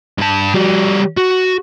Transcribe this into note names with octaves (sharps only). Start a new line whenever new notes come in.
G2 A5
G3 F#4
F#4